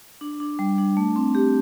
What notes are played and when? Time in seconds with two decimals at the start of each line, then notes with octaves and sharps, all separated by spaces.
0.21 D4
0.40 D4
0.59 G3
0.78 D4
0.97 A3
1.16 C4
1.35 G4